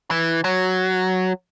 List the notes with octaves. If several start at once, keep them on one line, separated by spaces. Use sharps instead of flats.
E3
F#3